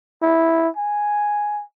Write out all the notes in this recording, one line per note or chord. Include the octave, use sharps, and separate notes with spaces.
E4
G#5